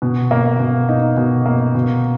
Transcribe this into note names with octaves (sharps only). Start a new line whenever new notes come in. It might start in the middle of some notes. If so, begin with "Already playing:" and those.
B2
A#3
B2
D#4
B2
A#3
B2